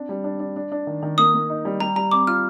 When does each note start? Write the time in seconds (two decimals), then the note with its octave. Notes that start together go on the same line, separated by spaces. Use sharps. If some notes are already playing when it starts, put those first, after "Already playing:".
Already playing: C4 D4
0.09 G3
0.24 D4
0.40 D4
0.56 D4
0.72 D4
0.87 D#3
1.03 D#3
1.18 A#3 D#6
1.34 A#3
1.49 D#4
1.65 G3
1.80 G3 A#5
1.96 G3 A#5
2.11 C4 D6
2.27 F4 F6